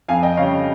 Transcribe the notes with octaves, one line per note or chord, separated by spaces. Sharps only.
F2 F5 G#5
D#5 G5
C#3 G3 C#5 F5